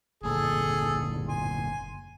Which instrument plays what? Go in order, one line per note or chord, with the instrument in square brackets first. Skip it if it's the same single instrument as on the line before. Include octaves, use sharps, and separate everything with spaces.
[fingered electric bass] F#1 A#2 D3 [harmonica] G#4 A4
[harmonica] G#5 C6